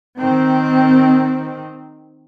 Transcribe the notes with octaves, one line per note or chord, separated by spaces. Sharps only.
D#3 C4